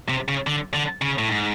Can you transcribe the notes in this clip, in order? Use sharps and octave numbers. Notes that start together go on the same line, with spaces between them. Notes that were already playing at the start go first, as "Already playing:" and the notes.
C3
C#3
D3
D3
C#3
A2
G#2